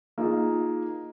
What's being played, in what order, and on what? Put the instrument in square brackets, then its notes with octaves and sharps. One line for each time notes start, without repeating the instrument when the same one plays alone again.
[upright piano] A#3 D#4 F4 G#4